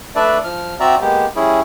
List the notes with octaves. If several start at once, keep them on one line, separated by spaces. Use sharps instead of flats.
A3 D4 B4 D5 E5
F3 F6
C4 F#4 D5 E5 A#5
G#3 A#3 B3 G4
G3 C#4 E4 G#4